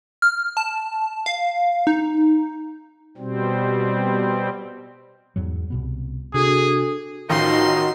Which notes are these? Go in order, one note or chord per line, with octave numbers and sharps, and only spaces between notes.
F6
A5
F5
D#4
B2 G3 C4
E2 G#2 F#3
C2 B2 B3
C3 D4 F#4 G#4 A4
A1 D#3 F3 D#4 F#4 A#5 C6